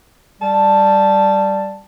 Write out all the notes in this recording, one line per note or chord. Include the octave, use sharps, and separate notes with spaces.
G3 A5